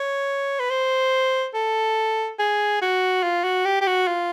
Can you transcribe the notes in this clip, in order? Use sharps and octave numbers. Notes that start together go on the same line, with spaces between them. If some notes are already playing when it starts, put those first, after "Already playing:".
Already playing: C#5
B4
C5
A4
G#4
F#4
F4
F#4
G4
G4
F#4
F4